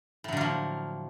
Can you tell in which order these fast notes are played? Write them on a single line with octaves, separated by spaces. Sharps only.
A2 F#3 D3 A#3 F3